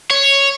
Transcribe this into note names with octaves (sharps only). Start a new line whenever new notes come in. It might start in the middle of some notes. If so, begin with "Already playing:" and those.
C#5